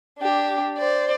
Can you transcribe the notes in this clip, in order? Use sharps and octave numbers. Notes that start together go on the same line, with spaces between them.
D4 G4
C5 D5